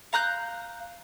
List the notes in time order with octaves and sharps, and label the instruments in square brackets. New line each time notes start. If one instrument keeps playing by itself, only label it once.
[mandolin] F5 A#5 F#6 G6